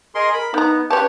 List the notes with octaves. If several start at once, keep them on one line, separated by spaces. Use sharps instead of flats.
G#4 A#4 D#5 C6
A#4 B5
D#3 B3 D#4 A#5
C#3 G4 B4 C#5 A5